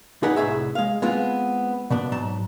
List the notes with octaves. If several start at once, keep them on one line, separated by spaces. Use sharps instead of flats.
D4 D#4 G#4 B4 F#5 B5
C2 A2 G#4 E5
G#3 F5
G#3 B3 C4 F4
B2 B3 D4
G#2 F#3 A5